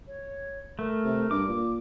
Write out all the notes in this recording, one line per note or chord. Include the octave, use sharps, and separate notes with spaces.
C#5
A3 A#4
C3
G2 D6
A#2